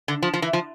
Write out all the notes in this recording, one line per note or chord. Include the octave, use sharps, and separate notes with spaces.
D3
F3
F3
E3
F3